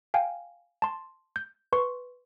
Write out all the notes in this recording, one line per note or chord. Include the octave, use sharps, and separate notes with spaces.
F5 G5 G#5
A5 C6
G6
B4 C6 C#6